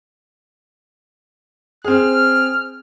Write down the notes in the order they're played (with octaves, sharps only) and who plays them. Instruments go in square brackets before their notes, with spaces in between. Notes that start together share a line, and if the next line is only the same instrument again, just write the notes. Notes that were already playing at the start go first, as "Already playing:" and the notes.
[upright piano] C4 G#4 [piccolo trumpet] F6